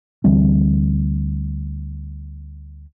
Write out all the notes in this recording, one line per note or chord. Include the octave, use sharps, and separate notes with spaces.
D2 E3 G3 C4